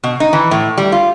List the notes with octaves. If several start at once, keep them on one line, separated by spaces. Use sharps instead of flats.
B2
D#4
E3
A2
G3
F4